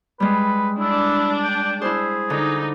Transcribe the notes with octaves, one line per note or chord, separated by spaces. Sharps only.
G3 G#3 B4
D4 E4
G5
E4 G#4 C5
D3 D#4